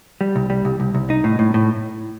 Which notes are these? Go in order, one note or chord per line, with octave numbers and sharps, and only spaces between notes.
G3
C2
G3
C2
C2
C2
D#4
A2
A2
A2